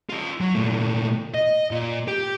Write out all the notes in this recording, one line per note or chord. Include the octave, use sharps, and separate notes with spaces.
F4 D#5
F#3
A#2 A3
D#5
A#2
G4